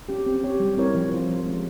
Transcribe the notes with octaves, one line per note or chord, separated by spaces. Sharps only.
C#4 G4
C4
G4 C#5
G3
C4 E4 A#4 C#5
F3
C4 F4 C5
F3
G#3 C#4 G4